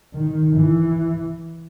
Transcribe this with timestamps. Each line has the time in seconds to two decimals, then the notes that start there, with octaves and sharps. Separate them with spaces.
0.14 D#3
0.56 E3